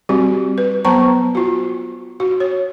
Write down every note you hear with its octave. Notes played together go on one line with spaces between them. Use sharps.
G3 C4 F#4 G4
B4
F#3 B3 C5 A5 A#5 C#6
F4 F#4
F#4
C#5